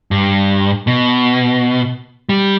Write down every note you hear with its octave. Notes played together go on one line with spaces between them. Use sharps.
G2
B2
G3